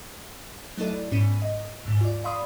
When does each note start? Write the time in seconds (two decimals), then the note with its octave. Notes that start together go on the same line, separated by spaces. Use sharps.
0.78 F#3 A3 D#4 E4 A4 D5
1.12 G#2 B2 C#4 B6 D#7
1.42 D#5
1.85 D#2 G#2
2.01 F4 D5
2.24 D5 F5 B5 C6 D#6